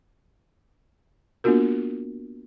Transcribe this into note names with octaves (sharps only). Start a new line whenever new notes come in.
A#3 B3 D4 F4 F#4 A#4